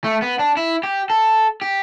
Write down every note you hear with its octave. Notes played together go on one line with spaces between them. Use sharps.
A3
B3
D4
E4
G4
A4
G4